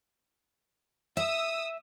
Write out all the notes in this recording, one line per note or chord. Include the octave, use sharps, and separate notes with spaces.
E5 D#6 E6